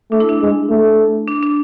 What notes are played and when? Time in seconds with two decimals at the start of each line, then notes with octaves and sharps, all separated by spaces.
0.11 A3 D4
0.20 E4
0.29 D4
0.41 G#3
0.70 A3
1.28 D4
1.43 D4